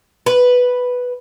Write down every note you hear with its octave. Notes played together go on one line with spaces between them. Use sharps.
B4